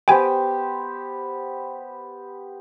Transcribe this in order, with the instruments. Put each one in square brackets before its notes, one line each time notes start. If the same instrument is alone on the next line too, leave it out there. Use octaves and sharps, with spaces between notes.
[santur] B3 G4 C5 [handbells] G5 G#5